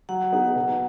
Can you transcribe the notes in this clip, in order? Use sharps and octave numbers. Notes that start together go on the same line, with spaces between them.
F#3 F#5
B3 D#4 G#4
B2